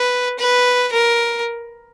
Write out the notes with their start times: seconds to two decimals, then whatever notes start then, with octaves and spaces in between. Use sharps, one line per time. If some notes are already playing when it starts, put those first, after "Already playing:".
Already playing: B4
0.39 B4
0.93 A#4